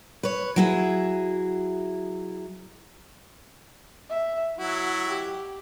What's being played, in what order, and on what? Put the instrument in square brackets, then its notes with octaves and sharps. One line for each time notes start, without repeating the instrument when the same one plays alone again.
[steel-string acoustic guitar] B4 C#5
F#3 E4 G#4
[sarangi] E5
[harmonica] F#3 E4 [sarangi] F#4
[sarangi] G4